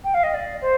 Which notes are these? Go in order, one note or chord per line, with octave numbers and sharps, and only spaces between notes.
G5
F5
D#5
D5
C5